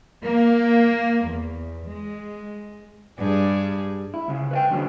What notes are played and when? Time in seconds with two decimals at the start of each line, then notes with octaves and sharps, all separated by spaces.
0.24 A#3
1.27 E2
1.87 G#3
3.18 G2 G3 G#4
4.14 E4
4.28 C#2 C#3
4.51 B4 E5 G5
4.70 E2 D3 F#3 C#4